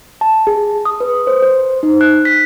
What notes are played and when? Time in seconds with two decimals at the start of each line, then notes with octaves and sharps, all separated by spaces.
0.21 A5
0.47 G#4
0.85 D#6
1.00 B4
1.27 C5
1.42 C5
1.83 D#4
2.01 F#6
2.25 B6